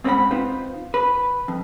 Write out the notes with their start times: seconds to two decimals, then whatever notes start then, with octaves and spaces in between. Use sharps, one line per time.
0.04 G#2 C4 C#4 B4 F#5 B5
0.31 C4 D#4 F4 B4 C5
0.94 B4
1.48 F2